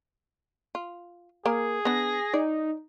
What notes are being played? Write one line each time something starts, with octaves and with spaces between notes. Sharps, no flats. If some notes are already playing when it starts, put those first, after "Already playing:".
F4
A#3 G#4 A#4
B3 D4 A#6
D#4 D5